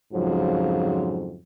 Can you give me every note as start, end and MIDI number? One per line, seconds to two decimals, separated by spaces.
0.14 1.39 41
0.14 1.39 44
0.14 1.39 49
0.14 1.39 53
0.14 1.39 54